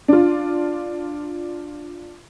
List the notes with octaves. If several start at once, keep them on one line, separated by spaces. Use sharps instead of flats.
D4 F4